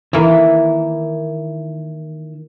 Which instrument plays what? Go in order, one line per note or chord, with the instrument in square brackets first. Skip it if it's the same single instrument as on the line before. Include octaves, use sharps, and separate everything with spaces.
[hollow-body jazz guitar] D#3 E4 [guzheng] E3 A#3